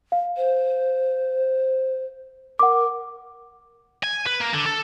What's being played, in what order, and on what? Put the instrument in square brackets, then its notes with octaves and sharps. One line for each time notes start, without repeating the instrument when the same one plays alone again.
[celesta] F5
[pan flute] C5
[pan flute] A#4 [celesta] F#5 D6
[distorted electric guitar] G#5
B4
A#3
D3
A4